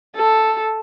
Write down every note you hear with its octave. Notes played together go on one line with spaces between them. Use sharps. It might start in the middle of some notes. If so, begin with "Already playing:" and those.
A4